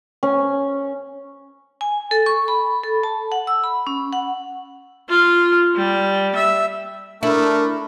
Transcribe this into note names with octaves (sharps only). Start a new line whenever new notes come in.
C#4
G#5
A4
C#6
B5
A4
A5
F#5
E6
B5
C#4
F#5
F4
G3
E5
A3 D4 E4 A#4